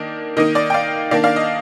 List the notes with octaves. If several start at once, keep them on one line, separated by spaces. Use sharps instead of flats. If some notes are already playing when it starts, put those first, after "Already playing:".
Already playing: D#3 A#3 D4 D#5
D#3 A#3 D#4 D#5
D5
G5
D5 F5
D#3 A#3 D4 D5 F5
D5 F5
D#5